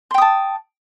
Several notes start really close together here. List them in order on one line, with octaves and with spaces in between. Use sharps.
C6 G5 D#6 A5